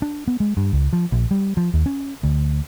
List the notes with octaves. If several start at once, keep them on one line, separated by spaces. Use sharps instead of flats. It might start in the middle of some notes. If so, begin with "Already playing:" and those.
D4
B3
G#3
G2
C#2
F3
A#1
G3
F3
D#2
C#4
D2